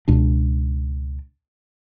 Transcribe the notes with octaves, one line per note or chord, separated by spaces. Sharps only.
C#2 B2 D4